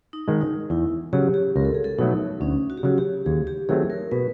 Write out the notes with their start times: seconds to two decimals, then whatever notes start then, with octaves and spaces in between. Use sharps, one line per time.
0.13 D#4
0.28 D#3 G#3
0.41 D#4
0.70 E2 E4
1.13 C#3 F#3 G4
1.34 G4
1.56 C#2 A#4
1.65 A4
1.74 G#4
1.84 A4
1.99 B2 F#3 A3 D#4
2.40 D2 C#4
2.70 F#4
2.77 G4
2.83 C#3 F#3 F#4
2.98 G4
3.26 D#2 G#4
3.47 G4
3.69 D#3 F#3 A3 C4 G#4
3.90 A#4
4.11 B2 B4